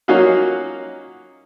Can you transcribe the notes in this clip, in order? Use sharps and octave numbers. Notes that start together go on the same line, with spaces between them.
F#3 A#3 C#4 D#4 F4 F#4